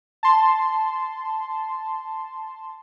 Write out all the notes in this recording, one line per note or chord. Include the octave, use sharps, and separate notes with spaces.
A5 C6